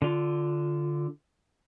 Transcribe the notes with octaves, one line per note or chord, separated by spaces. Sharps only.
D3 F4